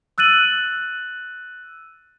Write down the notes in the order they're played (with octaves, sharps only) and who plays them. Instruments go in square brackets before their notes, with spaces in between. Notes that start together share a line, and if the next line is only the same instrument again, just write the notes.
[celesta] E6 F#6 A6 D#7 F#7